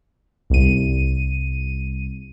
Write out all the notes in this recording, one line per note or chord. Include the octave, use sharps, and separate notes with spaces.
C2 D#7